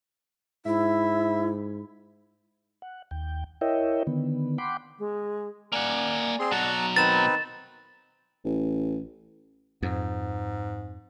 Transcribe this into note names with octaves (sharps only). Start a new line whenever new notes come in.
G#2 E4 E5
F#5
D#2 G5
E4 A#4 C#5 D#5 E5 G5
D3 D#3 B3
F#5 G5 B5 C6 D6
G#3
A#3 D5 F#5 G#5
C4 G#4 C6
B2 F#3 F#5 A5 A#5
D#3 C4 D#4 B4 A6 E7
A1
F2 G#2